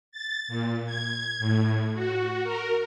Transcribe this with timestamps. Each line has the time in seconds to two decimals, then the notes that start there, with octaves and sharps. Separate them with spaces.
0.12 A6
0.48 A#2
0.85 G#6
1.39 A2
1.94 F#4
2.44 A#4